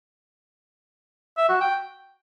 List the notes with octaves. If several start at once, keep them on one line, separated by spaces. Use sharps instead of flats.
E5
F#4
G5